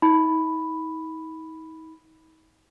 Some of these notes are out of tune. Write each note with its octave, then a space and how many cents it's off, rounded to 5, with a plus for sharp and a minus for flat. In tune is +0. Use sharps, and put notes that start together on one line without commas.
D#4 +40 B5 +0